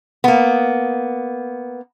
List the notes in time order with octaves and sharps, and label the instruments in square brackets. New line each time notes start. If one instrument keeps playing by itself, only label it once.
[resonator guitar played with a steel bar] A#3 B3